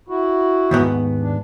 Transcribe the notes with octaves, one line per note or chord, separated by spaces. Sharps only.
E4 F#4
D#2 G#2 B3
D4